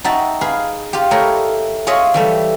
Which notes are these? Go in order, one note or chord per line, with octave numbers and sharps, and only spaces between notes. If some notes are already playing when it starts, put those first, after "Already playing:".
D#4 F#4 E5 G5 A5
G#4 B4 F5
F4 G4
A3 E4 A#4 C#5 D#5
F4 G#4 C#5 D#5 E5
E3 G3 A3